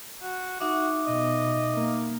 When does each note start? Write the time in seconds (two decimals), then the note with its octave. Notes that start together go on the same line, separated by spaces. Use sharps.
0.22 F#4
0.60 D#4 F#4 E5 D6
1.06 B2 D#5
1.73 A#3